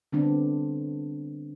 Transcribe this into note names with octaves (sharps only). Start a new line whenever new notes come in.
D3 G3 B3 C4 D4